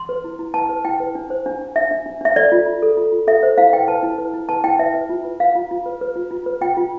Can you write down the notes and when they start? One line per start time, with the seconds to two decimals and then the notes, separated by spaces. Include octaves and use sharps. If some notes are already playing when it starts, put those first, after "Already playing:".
Already playing: C6
0.09 B4
0.24 E4
0.39 E4
0.54 B4 A5
0.69 B4
0.85 E4 G5
1.00 B4
1.15 D4
1.30 C5
1.46 D4
1.61 D4
1.76 D4 E5
1.91 D4
2.06 D4
2.21 D4 E5
2.36 A4 D5
2.52 F4
2.66 F4
2.82 A4
2.97 F4
3.12 F4
3.27 A4 E5
3.43 C5
3.58 E4 F5
3.73 B4 G5
3.88 B4 A5
4.03 E4
4.18 B4
4.34 E4
4.49 B4 A5
4.64 E4 G5
4.79 B4 E5
4.94 B4
5.09 F4
5.25 B4
5.40 B4 F5
5.55 F4
5.71 F4
5.86 B4
6.01 B4
6.16 F4
6.31 F4
6.46 B4
6.61 F4 G5
6.77 F4